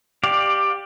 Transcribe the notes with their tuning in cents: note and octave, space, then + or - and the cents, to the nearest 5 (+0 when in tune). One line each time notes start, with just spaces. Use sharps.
G4 +10 D5 +20 F5 +15